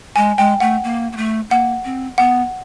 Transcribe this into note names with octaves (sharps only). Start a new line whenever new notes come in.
G#3 G#5
G#3 G5
A3 F#5
A#3
A#3
A3
A#3 F#5
C4
B3 F#5